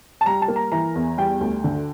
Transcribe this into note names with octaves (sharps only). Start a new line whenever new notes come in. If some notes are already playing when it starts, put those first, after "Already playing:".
A5
G3 A#5
A5
A#3
A#5
E3 A#5
E2
G3 G5
D2
D3